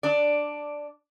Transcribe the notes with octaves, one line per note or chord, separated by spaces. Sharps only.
D4 D5